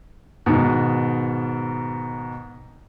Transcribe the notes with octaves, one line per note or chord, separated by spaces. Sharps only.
G#2 B2 D#3